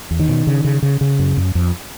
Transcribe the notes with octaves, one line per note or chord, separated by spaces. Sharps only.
E2
D#3
B2
C#3
C#3
C#3
C#3
F#2
F#2
F2